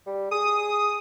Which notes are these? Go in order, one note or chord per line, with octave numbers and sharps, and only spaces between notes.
G3
G#4 D#6